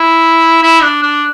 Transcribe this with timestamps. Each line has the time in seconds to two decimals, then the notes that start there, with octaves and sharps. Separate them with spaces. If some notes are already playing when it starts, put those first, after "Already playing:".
Already playing: E4
0.63 E4
0.82 D4
1.03 D4